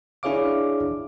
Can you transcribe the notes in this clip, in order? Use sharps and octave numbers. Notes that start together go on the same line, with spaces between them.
D4 E4 G#4 C#5 F5 D6